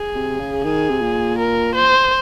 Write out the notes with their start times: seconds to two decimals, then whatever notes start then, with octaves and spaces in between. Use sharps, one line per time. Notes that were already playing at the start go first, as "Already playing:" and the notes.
Already playing: G#4
0.15 C3
0.39 C#3
0.64 D#3 G#4
0.89 C3
1.01 A#2
1.39 A#4
1.75 C5